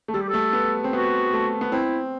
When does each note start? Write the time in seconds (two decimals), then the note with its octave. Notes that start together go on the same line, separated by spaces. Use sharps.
0.08 A3
0.14 G3 A4
0.22 G4
0.29 A3 A4
0.53 B3
0.84 C4
0.93 B3 F#4
1.33 A3
1.61 B3
1.72 C4 E4